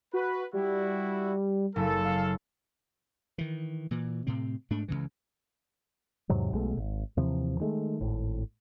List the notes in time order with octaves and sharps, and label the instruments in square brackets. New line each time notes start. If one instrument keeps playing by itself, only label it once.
[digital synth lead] F#4 [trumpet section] B4
[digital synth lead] G3 [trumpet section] E4 F#4
[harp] F#1 [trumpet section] A4
[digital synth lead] F5
[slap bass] D#3 E3
A#2 E3
A2 C3 C4
G#2 A3 D4
C#2 G#2 C#3 E3
[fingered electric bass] E2 G#2 C3 F#3
B1 B2 G#3 A3
G#1
D#2 C3 E3 F3
D#3 G#3 A3
G#1 A2